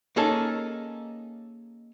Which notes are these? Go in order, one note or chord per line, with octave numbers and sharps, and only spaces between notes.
A#3 C#4 D#4 G#4 A4